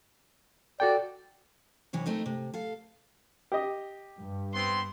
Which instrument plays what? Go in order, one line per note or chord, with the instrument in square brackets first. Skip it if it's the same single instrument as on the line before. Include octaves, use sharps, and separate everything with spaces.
[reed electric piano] F#4 A4 G5 [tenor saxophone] D5
[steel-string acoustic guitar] G2 C3 E3 C#5
A3 C4 D#4 A#4
C3
A4 F5
[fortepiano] G4 D#5
[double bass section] G2
[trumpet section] B3 C4 C6